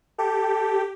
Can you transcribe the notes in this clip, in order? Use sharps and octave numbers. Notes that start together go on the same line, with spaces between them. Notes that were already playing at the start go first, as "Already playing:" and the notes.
G4 A4